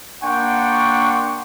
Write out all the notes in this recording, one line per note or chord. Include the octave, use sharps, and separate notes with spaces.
A#3 D4 F#5 G5 C6 C#6